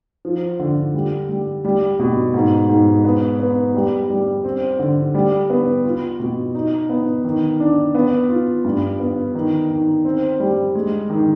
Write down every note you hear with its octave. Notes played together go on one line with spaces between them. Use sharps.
F3
D3
G3
G3
G3
B2
G#2
G#2
B3
B3
G3
G3
C4
D3
G3
B3
F4
B2
D#4
B3
D#3
D4
B3
F4
G2
B3
D#3
D#3
C4
G3
G#3
D#3